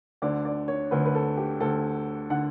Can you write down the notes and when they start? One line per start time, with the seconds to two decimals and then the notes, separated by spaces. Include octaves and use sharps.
0.22 D2 D3 D5
0.45 D5
0.68 C#5
0.91 D2 D3 B4
1.05 B4
1.15 A4
1.37 G4
1.61 D2 D3 A4
2.30 D3 F#5